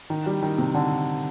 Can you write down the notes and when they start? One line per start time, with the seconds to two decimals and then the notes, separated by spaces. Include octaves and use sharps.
0.10 D#3
0.26 G3
0.42 D#3
0.58 C3
0.74 D3